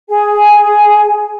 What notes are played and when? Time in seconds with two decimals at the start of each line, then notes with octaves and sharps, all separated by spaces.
0.09 G#4 G#5